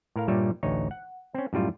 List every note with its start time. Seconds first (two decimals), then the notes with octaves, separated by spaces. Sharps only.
0.16 A2 A#4 F5
0.28 G2 A#2 G3 C#5 E5
0.63 A1 D2 D#4 C#5
0.91 F#5
1.34 C4 C#4
1.53 F#2 A2 G3 F4